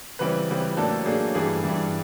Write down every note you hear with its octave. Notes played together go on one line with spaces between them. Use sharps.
C#3 E3 G3 C4 B4
C#3 E3 G3 C4
A2 F#3 A#3 D4 A4
A2 F#3 A#3 D4 G#4
G2 E3 G3 G#4
G2 E3 G3